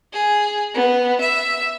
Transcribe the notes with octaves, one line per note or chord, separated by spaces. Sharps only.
G#4
B3
E5